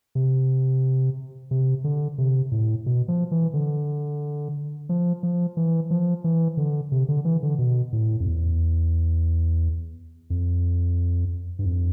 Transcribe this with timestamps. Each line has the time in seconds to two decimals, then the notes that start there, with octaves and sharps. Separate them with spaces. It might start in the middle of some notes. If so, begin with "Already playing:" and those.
0.15 C3
1.51 C3
1.84 D3
2.18 C3
2.52 A2
2.86 B2
3.08 F3
3.31 E3
3.54 D3
4.89 F3
5.23 F3
5.57 E3
5.91 F3
6.24 E3
6.57 D3
6.92 C3
7.09 D3
7.25 E3
7.43 D3
7.59 B2
7.93 A2
8.20 F2
8.27 E2
10.30 F2
11.59 G2
11.65 F2